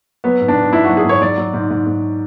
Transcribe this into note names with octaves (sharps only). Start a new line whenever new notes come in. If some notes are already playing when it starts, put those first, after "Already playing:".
F#3 B3
G#2
D4
G#2
G#2 E4
F#4
F#3
G#4
G#2 C#5
F#3 D5
F#3
G#2
G#2
G#2